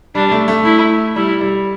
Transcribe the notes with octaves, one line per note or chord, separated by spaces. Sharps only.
G3 D4
A3
A3
E4
G3 E4
G3